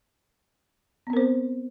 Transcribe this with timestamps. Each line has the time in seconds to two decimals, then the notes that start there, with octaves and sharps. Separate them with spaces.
1.07 B3
1.10 C4
1.13 A#4
1.17 C5